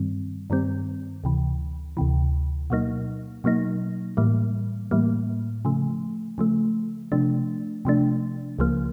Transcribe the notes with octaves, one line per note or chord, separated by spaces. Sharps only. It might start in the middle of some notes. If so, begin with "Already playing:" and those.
Already playing: G2 D#3 G3 C4
G2 D#3 G3 C4
D2 C3 E3
D2 C3 E3
B2 F#3 A#3 D#4
B2 F#3 A#3 D#4
A2 E3 G3 A#3
A2 E3 G3 A#3
C#3 F3 A3
C#3 F3 A3
C3 F3 A3 D4
C3 F3 A3 D4
C#2 C#3 F3 A#3